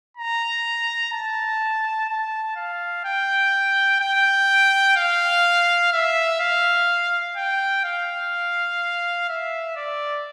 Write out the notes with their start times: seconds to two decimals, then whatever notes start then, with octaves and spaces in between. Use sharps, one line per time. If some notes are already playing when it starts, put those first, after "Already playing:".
0.17 A#5
1.13 A5
2.09 A5
2.56 F5
3.05 G5
4.00 G5
4.97 F5
5.93 E5
6.40 F5
7.37 G5
7.84 F5
9.29 E5
9.76 D5